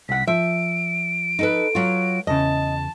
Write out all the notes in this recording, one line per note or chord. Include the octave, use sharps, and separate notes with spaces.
C2 F#5 B6
F3 E5 D7
D#4 A4 B4
F#3 F4
E2 C#3 D#5 A5